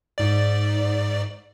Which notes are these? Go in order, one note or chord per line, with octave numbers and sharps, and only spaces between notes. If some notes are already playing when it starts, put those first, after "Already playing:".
G#2 D5